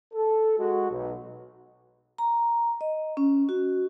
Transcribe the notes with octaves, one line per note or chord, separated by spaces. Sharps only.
A4
G#3 F#4
B1
A#5
D#5
C#4
F#4